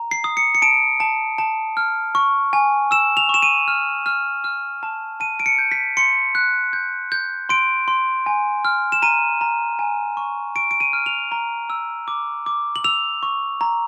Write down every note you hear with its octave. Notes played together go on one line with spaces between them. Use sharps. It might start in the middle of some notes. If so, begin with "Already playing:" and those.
Already playing: A#5
C7
D#6
C#7
C#7
A5 D7
A5
A5
F6
C#6
G#5
E6 E7
F7
C#6 E7
D#7
F6
F6
F6
A5
A5 D#7
D7
C#7
G6
B6
C6 C#7
F#6
G6
G6
C6 D7
C6
G#5
F6
E7
A#5 D#7
A#5
G#5
C#6
C#6 D7
D7
D#7
F6
F7
A#5
E6
D6
D6
F#7
E6 F7
C#6
A#5